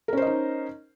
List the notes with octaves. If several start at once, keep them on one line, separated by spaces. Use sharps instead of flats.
C#4 D#4 A#4 C5 D#5